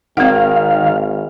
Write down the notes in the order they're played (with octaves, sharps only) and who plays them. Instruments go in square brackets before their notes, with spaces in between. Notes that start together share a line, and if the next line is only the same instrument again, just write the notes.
[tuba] G#1 [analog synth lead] D#3 [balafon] C4 F#5 [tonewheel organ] F5